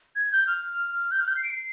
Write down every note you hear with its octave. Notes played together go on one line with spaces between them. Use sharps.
G#6
G6
F6
G6
F6
G6
C7
D7
C7